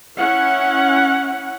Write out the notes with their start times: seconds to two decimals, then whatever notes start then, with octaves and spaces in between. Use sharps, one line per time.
0.17 C#4 E4 F#5